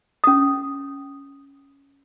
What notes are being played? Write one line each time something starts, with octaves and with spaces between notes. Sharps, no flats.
C#4 D#6